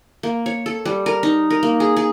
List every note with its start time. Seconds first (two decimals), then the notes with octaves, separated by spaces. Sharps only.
0.23 A#3
0.46 C#5
0.66 A4
0.85 G3
1.06 A#4
1.23 D#4
1.50 A#4
1.63 A#3
1.80 G#4
1.97 G#4